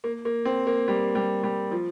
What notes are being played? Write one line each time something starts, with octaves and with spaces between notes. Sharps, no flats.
A#3
A#3
C4
A#3
G3
G3
G3
F3